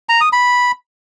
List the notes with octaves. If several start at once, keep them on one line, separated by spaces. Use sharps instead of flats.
A#5
D#6
B5